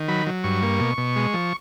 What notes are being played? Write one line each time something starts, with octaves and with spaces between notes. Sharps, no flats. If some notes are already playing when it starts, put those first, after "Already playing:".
Already playing: D#3
F#3 B5
F#3
G2 C#6
A#3
B2
B2
G#3
F3